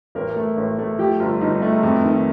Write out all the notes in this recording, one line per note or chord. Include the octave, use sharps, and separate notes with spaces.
A1 A#4
A3
A1
A3
F3 G4
G1 F4
G1 D#4
A3
F2
D#3